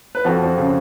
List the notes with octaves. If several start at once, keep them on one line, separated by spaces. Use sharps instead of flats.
B4
F2 F#4 A4
F2
C#3